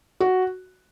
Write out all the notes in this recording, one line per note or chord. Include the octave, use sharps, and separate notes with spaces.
F#4